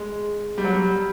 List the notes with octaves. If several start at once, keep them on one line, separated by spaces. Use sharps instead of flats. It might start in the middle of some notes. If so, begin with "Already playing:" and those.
Already playing: G#3
G3
F#3
G3